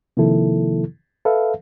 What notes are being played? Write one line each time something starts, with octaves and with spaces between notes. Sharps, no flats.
C3 D#3 F3 A#3 E4 A4
A4 B4 E5 F5